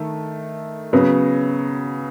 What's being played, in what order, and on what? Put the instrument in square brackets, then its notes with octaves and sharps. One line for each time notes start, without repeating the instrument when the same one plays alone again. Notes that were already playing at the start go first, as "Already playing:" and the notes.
Already playing: [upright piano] D#3 A3
C#3 F#3 B3